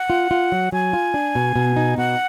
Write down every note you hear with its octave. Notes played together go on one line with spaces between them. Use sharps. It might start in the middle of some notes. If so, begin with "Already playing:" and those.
Already playing: F#5
F4
F4
F#3
F#3 G#5
F4
D4
B2
B2
D#4
B2 F#5